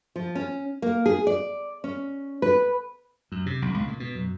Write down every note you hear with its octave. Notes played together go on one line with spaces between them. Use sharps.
F3
C#4
A#3
G#4
D5
C#4
B4
F#2
C3
B1
C#2
A#2
B2
F#2